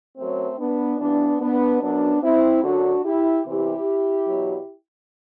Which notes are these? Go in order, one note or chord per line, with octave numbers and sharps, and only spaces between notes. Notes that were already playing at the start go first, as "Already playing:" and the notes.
F#2 F#3 A3 C4
B3 D4
G2 E3 B3 D4
B3 D4
F#2 F#3 B3 D4
C4 E4
F#2 D3 F#3 D4 F#4
E4 G4
E2 C3 E3 E4 G4
E2 B2 F#3